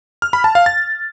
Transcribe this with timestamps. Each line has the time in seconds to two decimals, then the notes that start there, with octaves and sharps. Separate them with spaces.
0.22 F6
0.33 B5
0.44 A5
0.55 F5
0.66 A6